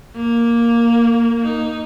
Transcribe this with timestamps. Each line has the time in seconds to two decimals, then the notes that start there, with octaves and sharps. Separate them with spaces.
0.16 A#3
1.41 D#4